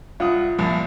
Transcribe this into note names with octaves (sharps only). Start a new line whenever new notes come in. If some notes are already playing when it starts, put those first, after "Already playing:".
C2 F4 F#5 D#6
C2 A#2 F3